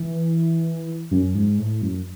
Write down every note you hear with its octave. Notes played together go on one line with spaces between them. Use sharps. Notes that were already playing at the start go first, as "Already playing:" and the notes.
Already playing: E3
F#2
G#2
A2
F#2